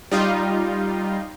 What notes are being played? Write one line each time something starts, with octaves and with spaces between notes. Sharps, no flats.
G3 D#4 F4